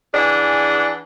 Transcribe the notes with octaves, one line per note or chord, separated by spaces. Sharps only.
E3 D4 G#4 F#5